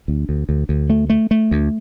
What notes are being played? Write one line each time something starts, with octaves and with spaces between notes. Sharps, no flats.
D2
D2
D2
D2
A3
A3
A3
D2